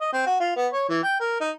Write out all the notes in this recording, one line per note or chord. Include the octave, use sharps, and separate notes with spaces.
D#5
C4
F#4
F4
B3
C#5
E3
G5
A#4
D#4